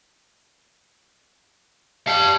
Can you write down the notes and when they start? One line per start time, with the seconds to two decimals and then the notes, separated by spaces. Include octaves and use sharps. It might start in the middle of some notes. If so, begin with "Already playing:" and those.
2.07 G4 F5 G5 A5